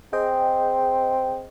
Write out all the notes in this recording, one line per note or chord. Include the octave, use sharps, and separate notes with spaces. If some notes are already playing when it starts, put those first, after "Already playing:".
C4 G#4 D#5 G5